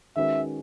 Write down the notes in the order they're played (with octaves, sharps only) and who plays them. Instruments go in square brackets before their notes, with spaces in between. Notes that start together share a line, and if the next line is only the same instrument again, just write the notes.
[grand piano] D#3 G#3 C#4 F#4 B4 [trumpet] E5